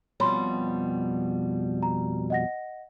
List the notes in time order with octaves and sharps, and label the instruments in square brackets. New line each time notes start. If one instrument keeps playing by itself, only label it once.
[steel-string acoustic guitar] F2 B2 G3 [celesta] C#5 B5 C6
[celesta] A#5
D#5 F#5 A#6